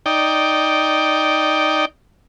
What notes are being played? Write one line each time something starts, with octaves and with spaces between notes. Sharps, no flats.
D#4 D5 G5